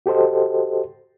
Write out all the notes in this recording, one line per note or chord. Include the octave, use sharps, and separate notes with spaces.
F#4 G4 A4 C5 D#5